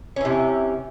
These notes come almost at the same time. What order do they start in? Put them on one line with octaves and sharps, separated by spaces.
C#4 E3 C3